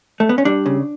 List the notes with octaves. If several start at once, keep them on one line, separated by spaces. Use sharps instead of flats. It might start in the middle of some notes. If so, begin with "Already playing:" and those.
A3
B3
C#4
G3 D4
C#3